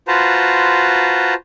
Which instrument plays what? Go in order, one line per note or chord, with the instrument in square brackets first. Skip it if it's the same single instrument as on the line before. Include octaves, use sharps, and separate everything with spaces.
[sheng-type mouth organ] F4 F#4 B4 C5 A5 A#5